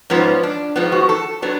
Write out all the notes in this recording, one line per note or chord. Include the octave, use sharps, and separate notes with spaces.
G#2 F3 B3 C#4
D4
G#2 F3 B3
F#4
A4
F#3 B3 D4